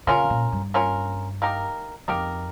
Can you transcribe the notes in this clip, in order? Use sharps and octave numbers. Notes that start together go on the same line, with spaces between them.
C#3 A#3 C#4 F4 A#4
A#2
G2
A#3 C#4 F4 A#4
A#3 D#4 G4 A#4
F2 A#3 D#4 G4 A#4